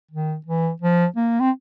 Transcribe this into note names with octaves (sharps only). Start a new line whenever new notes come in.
D#3
E3
F3
A#3
C4